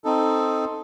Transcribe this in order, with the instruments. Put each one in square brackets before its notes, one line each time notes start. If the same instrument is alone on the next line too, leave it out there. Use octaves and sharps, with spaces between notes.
[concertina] C4 D#4 A4